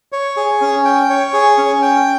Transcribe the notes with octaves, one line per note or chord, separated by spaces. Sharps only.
C#5
G#4
C#4
G5
C#5
G#4
C#4
G5